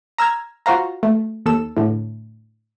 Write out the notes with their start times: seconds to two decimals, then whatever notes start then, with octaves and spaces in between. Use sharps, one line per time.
0.18 A#5 E6 F6 G#6
0.66 F4 F#4 C5 F5 A#5
1.03 A3
1.46 D#2 A4 E6
1.77 A2 D3